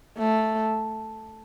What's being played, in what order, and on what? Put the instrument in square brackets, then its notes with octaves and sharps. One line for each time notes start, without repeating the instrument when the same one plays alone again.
[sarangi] A3